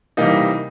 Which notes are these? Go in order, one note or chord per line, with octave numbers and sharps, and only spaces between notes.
C3 E3 G3 A#3 D#4